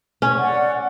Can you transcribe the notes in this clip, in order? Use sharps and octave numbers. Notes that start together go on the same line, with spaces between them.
C#4
D5 F#5